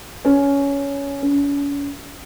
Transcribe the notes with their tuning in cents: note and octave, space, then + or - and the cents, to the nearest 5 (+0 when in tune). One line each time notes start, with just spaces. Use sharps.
C#4 +15
C#4 +40